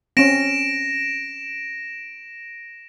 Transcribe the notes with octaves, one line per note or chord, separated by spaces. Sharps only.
C4 C#4 A#6 D7 E7